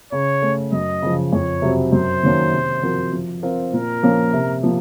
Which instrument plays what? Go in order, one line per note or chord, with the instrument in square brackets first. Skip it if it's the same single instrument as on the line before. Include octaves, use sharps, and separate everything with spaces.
[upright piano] C#3 [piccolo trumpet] C#5
[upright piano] A3 C#4 A4
[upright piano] F#2 [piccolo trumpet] D#5
[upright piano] C#3 F3
[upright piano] F2 [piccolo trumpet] C#5
[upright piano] C3 F#3 C4
[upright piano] F#2 [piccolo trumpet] C5
[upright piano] D#3 F#3 A#3 C#4
C3
F3 C4 F#4 A#4
F3
C4 F4 A#4
[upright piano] A#2 [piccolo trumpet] A#4
[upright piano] F3 A#3 C#4
C3
F3 A#3